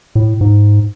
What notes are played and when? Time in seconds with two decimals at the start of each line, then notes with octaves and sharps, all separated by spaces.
0.15 A2
0.41 G#2